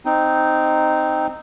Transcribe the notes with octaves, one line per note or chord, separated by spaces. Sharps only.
C4 D#4